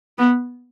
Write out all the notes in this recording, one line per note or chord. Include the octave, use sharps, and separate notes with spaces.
B3